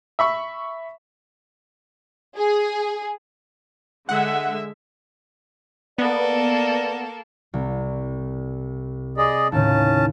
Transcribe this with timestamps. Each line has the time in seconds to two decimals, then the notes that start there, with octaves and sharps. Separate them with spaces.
0.19 E5 B5 C#6
2.38 G#4
4.09 D3 G#3 E5 F#5
5.98 A#3 B3 A4 D5
7.54 C2
9.17 G#4 D5 D#5 B5 E6
9.52 D#2 A2 C#3 C#4 A5